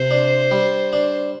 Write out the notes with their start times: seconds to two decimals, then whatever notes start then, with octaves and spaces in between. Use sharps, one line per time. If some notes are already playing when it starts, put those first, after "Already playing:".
Already playing: C3 C5
0.11 D4
0.51 G3
0.93 D4